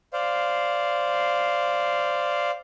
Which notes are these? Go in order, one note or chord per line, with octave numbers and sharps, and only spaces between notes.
C5 D5 F5